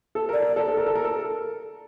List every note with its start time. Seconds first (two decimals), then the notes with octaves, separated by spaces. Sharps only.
0.15 A4
0.29 A#4
0.33 D5
0.42 A#4
0.56 A4
0.68 A4
0.77 A#4
0.87 A4
0.96 A#4
1.04 A4